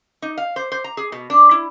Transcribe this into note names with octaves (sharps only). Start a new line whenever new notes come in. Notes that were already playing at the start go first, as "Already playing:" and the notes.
D#4
F5
C5
C5
A#5
G#4
B2
D4
E4